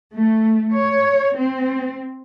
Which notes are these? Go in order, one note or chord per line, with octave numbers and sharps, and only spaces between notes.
A3
C#5
C4